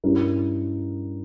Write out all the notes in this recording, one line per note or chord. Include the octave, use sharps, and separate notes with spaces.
G2 G3 C#4 E4 A#4